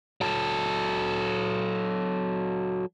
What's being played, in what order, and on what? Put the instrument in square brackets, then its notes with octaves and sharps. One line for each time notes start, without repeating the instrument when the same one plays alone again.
[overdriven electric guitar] F#3 A4